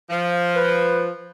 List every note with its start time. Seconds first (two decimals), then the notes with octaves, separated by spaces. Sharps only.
0.10 F3
0.56 B4